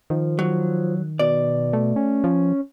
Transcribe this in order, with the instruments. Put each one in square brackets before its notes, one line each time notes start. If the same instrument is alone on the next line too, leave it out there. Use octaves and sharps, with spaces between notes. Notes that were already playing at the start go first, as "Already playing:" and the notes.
[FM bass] D#3 [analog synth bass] F3
[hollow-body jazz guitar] F#3
[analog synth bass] B2 [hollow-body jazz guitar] D5
[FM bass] A3
[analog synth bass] C#4
[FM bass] F3